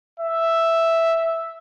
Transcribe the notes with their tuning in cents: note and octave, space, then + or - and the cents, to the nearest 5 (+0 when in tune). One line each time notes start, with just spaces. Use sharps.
E5 +0